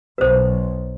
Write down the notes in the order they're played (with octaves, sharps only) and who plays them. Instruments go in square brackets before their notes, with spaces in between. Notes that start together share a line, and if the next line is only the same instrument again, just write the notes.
[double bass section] B1 [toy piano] B4 C5